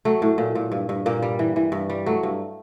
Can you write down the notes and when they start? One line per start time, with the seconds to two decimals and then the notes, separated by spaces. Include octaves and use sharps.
0.05 F#3 A3
0.22 A2
0.38 A#2
0.55 A#2
0.72 G2
0.89 G2
1.06 A#2 A#3
1.22 G3
1.39 E3
1.56 E3
1.72 G2
1.90 G3
2.06 F#3 A3
2.23 G2